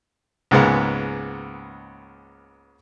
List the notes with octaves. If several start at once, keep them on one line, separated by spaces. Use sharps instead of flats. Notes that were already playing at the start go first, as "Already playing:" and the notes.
C#2 G#2 G#3 A#3 B3